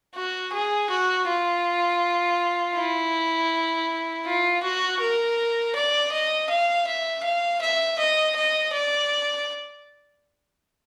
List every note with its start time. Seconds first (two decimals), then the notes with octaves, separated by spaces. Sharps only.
0.15 F#4
0.53 G#4
0.90 F#4
1.28 F4
2.76 E4
4.26 F4
4.63 F#4
5.01 A#4
5.75 D5
6.12 D#5
6.49 F5
6.87 E5
7.24 F5
7.61 E5
7.99 D#5
8.36 D#5
8.73 D5